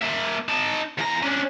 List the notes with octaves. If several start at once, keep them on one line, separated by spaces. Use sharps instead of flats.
A#3 E5
D#4 A5
E2 A#5
C#4 D4